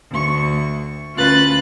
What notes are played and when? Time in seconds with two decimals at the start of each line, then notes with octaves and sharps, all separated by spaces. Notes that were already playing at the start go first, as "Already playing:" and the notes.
0.11 D2 C#6
1.17 D2 C#4 F4 B4 F#6 A6